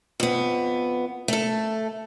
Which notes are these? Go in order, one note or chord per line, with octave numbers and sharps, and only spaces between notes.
F2 B3
A3 A4